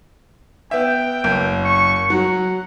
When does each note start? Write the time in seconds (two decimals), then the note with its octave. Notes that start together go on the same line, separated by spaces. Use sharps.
0.71 B3 E5 G5
1.24 F#1
1.64 C#6
2.10 F#3 F#5